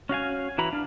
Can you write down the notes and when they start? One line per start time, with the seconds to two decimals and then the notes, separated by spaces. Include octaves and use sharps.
0.09 C#4 F#4 F5 G#5
0.58 E3 F#4 A#5 B5
0.73 D4 F5